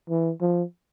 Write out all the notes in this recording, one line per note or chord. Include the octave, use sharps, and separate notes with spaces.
E3
F3